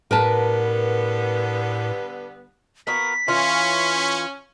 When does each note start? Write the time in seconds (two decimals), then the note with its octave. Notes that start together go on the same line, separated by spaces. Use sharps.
0.11 A2 D3 G3 B3 A#4 B4 A5
2.87 A#3 B3 F#4 B6
3.28 E3 C#4 F4